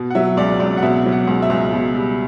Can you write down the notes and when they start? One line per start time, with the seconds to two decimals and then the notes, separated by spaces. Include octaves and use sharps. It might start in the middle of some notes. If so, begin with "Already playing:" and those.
Already playing: B2
0.10 F#5
0.15 F#3 E5
0.37 C#2 D5
0.60 C#2 D5
0.77 F#5
0.82 B2 E5
1.06 F#3
1.12 F#5
1.27 C#2
1.42 E5
1.50 C#2
1.73 B2
1.95 G3